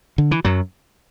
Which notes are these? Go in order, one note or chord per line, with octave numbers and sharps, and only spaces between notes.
D3
E3
F#2 F#3